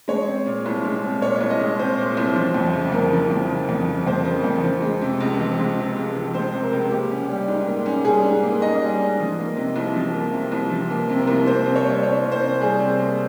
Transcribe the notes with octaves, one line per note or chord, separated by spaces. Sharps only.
G#3 C#5
C4
A#2
C2
G#3
C4
A#2 C#5
C2
D#5
G#3
C4 C5
A#2
C2
F3
F2
C#3
F2 A#4
F3
F2
C#3
F2
F3
F2 C5
C#3
F2
F3
G#3
C3
C#2
F3
G#3
C3
C#2
F3
G#3 C5
C3
A#4
C#2
A#3 G4
C#4
G3
G#2
A#3
C#4
G3 G#4
G#2
A#3
C#4 D#5
G3
G#2
F3
A#3
C3
C2
F3
A#3
C3
C2
F3
A#3
C3
A#4
C2
A#3 C5
C3
C#5
G3
C3 C#5
A#3
C5
C3
G3 G#4
C3
A#3